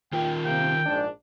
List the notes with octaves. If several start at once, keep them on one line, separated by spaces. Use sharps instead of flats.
D#3 F4 A#4 G5
C3 A#3 G5
A#1 G#2 D4